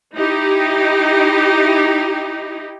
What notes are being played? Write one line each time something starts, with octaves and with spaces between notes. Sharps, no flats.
D#4 E4 G4